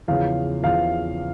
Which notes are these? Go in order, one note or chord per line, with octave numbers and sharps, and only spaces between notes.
E2 C#3 F3 F5
E2 C#3 F3 F5